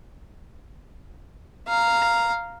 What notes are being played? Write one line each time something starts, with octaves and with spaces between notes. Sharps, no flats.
F5 A#5